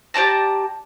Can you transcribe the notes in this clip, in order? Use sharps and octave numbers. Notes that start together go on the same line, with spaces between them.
G4 D5 A5 A#5